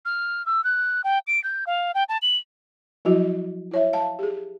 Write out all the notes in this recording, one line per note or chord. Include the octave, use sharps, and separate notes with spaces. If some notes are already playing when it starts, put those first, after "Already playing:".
F6
E6
F#6
G5
D7
G6
F5
G5
A5
F#7
F3 F#3 E4 F#4
E4 C#5 E5
F5 A5
G4 G#4